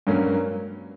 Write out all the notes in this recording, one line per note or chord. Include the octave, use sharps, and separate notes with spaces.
G2 F#3 A#3 C#4